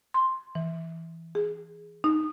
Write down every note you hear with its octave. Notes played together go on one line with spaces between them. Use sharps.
C6
E3
G#4
D#4